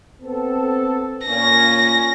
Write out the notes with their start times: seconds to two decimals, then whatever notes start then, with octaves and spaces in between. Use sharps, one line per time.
0.22 B3 C4 A4
1.27 A#2 C#4 A#6